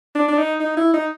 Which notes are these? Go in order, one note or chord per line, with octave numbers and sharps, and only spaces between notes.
D4
D4
D#4
D#4
E4
D#4